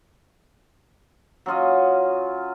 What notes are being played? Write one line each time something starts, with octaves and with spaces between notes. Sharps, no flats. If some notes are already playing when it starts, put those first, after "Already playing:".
F#3 C#4 F4 D#5